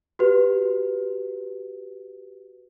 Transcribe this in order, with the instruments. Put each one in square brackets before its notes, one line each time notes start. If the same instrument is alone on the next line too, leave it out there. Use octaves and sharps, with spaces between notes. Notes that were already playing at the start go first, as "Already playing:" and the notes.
[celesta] F#4 G4 B4